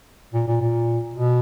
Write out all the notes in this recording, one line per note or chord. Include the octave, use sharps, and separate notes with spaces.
A#2
A#2
A#2
B2